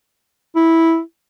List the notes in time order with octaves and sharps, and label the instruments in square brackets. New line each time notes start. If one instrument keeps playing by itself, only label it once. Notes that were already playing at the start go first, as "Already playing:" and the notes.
[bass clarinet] E4